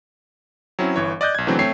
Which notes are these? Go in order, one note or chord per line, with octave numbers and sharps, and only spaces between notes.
F#3 C4 C#4 E4
G1 E3 C#5
D5 D#5 F#6 G6
B1 G#6
C#3 E3 F#3 A3 C4 D4
A3 C4 C#5 C7